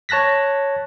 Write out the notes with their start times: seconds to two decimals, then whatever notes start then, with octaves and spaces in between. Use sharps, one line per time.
0.09 C#5 A5 F#6 A#6 B6